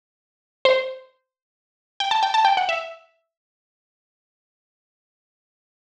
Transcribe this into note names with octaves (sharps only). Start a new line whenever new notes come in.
C5
G5
A5
G5
A5
G5
F#5
E5